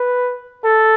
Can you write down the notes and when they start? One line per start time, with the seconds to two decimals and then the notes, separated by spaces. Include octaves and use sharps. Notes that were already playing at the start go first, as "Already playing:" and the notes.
Already playing: B4
0.64 A4